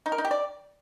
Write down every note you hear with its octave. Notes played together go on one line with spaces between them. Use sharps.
D#4
A#4
D#4
G4
D5